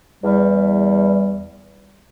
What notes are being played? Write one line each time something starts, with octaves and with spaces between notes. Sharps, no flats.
E2 G3